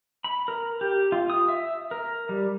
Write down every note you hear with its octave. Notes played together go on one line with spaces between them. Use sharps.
B5
A#4
G4
F4
D#6
E5
A#4
G3